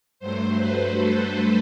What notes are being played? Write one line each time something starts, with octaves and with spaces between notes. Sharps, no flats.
G2 F#3 A3 C5
B4
A4